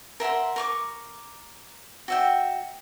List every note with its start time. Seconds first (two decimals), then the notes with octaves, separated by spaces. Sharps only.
0.20 A#4 E5 F#5 C6
0.56 A#4 C#6 D6
2.08 F#4 E5 G5